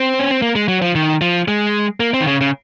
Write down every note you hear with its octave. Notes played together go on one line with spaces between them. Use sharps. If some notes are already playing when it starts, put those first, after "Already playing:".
Already playing: C4
C#4
C4
A#3
G#3
F#3
F3
D#3
F3
G#3
A#3
C4
D#3
C#3
C#3